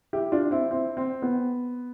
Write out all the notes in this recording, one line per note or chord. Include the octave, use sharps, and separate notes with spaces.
E4 G4
D4 F4
C4 E4
C4 E4
C4
B3